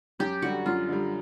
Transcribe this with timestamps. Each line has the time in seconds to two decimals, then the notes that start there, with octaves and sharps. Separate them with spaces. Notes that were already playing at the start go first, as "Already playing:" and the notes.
0.19 F#2 G4
0.42 D3 G3 F#4
0.66 F#2 F4
0.89 D3 G3